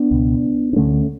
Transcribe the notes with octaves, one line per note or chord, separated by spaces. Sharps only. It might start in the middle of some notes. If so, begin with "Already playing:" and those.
Already playing: B3 D4
C#2 B2
D4
D2 D3 A3 C#4